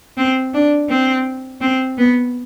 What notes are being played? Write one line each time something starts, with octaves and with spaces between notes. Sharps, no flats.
C4
D4
C4
C4
B3